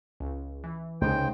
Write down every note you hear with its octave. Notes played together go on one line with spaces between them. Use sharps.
C#2
E3
C#2 C3 D#4 C5 G5